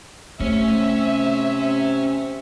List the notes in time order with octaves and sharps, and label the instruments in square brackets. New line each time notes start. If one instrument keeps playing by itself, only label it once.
[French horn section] C3 C5 [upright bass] A3 [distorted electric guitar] C#4 C#5 [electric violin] E5